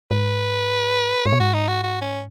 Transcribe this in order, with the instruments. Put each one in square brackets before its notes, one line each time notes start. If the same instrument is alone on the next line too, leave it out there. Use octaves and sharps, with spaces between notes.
[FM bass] G#2 [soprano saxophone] B4
[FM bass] G#2 [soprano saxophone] C#5
[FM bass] B2
[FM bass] G#2 [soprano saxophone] F#4
[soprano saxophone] D#4
F#4
F#4
C#4